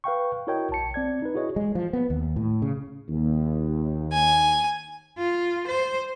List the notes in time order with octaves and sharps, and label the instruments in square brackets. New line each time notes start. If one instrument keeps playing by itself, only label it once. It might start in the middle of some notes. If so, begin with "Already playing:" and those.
[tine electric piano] B4 F5 G5 C#6
E4 F#4 A#4 C#5 D#5 G5
B1 A5 C#7
C4 D5 G#6
D#4 B4
E4 F#4 G#4 C#5 D#5
[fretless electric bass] G#3
F3
B3
D#2
A2
C#3
[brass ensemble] D#2
[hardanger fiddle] G#5
[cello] F4
C5